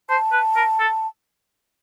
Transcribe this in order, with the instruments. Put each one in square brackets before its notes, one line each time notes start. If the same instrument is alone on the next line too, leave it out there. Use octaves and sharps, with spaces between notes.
[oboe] C5 [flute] A5
[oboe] B4
A#4
A4